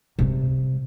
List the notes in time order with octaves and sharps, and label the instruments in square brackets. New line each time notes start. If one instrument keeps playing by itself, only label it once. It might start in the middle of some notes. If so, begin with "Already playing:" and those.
[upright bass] C3 G3